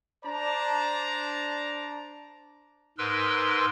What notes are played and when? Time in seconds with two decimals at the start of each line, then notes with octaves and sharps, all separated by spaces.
0.24 D4 C5 D5 A5 A#5
2.98 G#2 A#4 B4 C6 E6